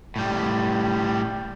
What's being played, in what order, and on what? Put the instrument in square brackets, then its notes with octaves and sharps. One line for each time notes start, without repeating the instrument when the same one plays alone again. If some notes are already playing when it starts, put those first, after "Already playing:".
[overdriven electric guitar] A2 G3